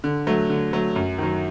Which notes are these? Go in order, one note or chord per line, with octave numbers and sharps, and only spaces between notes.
D3
F#3 A3
D3
F#3 A3
F#2
D#3 F#3